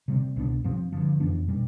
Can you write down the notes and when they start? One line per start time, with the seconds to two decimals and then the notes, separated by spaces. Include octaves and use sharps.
0.08 C3 G3 C4
0.36 C2 B2 B3 D4
0.64 G2 F3 C4
0.92 G2 D3 F3
1.20 F2 E3 B3 D4
1.48 B2 G3 D4